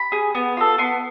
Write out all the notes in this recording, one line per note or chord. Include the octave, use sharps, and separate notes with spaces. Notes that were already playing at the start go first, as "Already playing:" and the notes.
Already playing: B5
G#4
B3
F4 A4
B3 C6